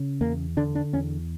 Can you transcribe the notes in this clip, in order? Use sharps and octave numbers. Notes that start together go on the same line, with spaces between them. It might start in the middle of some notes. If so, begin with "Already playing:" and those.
Already playing: C#3
E2 A#3
D3 D4
D4
E2 C#4